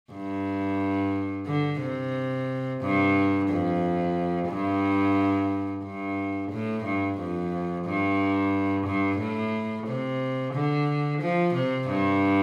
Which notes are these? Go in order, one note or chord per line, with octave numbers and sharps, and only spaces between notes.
G2
D3
C3
G2
F2
G2
G2
A2
G2
F2
G2
G2
A2
C3
D3
F3
C3
G2